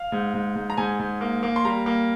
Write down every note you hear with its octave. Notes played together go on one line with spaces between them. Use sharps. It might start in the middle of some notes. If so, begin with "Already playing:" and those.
Already playing: F5
G#2
G#2
G#2
A#5
G#2 G#5
G#2
A#3
A#3
C6
G3 A#5
A#3